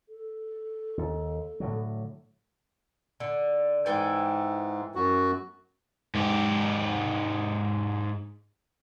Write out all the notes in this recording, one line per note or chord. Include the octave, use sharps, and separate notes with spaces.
A4
D#2
A2 D3 F#3
D3
G#2 E3 A4 G5
F#2 F#4
G#2 G4